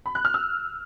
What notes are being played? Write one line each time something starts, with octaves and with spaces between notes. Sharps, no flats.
B5
F#6
F6
E6